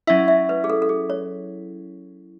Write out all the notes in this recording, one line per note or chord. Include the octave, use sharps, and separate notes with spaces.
F#3 C#4 E4 E5
E5
B4
G#4
A4
A4
G#4
C#5